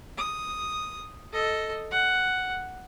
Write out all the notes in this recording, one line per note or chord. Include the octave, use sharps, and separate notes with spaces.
D#6
A4 D#5
F#5